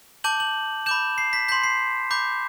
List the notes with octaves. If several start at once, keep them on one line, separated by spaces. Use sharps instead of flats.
A5 D6 G6 F#7
F#7
B5 D6 G6 E7
C7
B6
C6 G6 B6
C7
B5 D6 G6